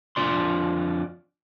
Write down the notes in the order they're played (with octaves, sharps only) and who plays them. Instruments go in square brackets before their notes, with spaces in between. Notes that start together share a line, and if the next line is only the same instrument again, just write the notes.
[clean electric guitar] F2 D4 F4 D5 C6